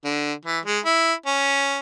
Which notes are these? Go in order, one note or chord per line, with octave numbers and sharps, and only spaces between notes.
D3
E3
G#3
E4
C#4